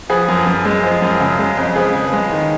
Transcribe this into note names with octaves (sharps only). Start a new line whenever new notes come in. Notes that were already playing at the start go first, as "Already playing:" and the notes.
F3 G#4 B4
F#2
F#2
G#3
F3
F#2
C#3
G#3
F2
F3 G#4 B4
C#3
G#3
D#3